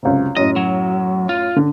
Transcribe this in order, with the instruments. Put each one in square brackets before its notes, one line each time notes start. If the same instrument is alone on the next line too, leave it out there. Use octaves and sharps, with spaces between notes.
[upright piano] C#2 F#2 C3
[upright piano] F#2 A2 [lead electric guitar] D#5
[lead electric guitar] F#3
F4
[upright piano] D3